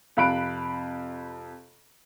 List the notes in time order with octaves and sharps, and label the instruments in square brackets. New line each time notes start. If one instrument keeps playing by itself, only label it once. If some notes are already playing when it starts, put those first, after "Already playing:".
[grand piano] F2 C3 F5 B5 F#6 D7